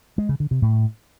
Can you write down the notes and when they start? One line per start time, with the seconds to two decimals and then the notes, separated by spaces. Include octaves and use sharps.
0.18 G#3
0.29 C#3
0.40 D3
0.51 C3
0.62 A2